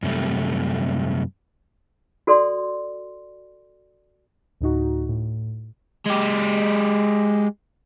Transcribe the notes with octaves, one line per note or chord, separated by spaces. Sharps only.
F#2 C3 G3 A3
F#4 A4 D5 C6
D2 A2 D#4 F#4
A2
G#3 G4